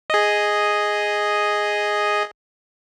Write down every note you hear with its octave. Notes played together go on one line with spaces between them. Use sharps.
G#4 D#5